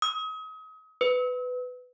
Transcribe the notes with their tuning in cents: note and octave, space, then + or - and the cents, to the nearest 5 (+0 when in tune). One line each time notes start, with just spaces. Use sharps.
D#6 +35
B4 +15